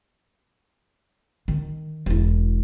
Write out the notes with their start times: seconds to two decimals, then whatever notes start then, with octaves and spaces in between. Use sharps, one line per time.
1.48 D#3
2.06 E1 E4